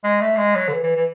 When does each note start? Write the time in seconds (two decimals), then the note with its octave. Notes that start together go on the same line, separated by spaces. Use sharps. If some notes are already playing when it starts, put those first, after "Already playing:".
0.04 G#3
0.21 A3
0.37 G#3
0.56 F#3
0.68 D3
0.73 E3
0.83 E3
0.96 E3